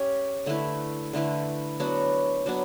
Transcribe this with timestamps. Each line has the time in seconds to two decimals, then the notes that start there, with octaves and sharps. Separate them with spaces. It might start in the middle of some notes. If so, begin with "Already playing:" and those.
Already playing: C#4 G4 C#5
0.46 D3 A3 E4 B4
1.13 D3 A3 E4 B4
1.80 F#3 B3 D4 F#4
2.46 F#3 B3 D4 F#4